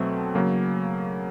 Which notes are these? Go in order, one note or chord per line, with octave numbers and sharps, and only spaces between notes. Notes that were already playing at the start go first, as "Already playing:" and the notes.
Already playing: B2 F#3 A3 C4
C#3 F#3 A#3